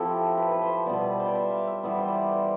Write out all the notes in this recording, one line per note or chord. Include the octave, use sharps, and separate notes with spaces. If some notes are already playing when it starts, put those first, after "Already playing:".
Already playing: F3 C4 E4 G4 A4
B4
B4
C5
B2 G3 B3 D5
C5
D5
E5
F5
E5
E3 G3 B3 E5
C5
D5
C5